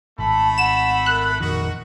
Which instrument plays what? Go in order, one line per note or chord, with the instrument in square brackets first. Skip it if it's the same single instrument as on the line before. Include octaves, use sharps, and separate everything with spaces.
[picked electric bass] G#1 [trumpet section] A3 B5 [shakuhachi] A5
[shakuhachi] F#5 [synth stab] E7
[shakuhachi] A#4 [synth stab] F#6
[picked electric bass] A#1 F2 D#3 [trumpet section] D#4 F#4 [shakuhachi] A#4